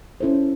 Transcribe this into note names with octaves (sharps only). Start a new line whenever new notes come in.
C#4 E4 A4 C5